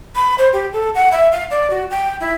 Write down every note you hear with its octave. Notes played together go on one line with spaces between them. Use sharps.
B5
C5
G4
A4
F#5
E5
F5
D5
F#4
G5
E4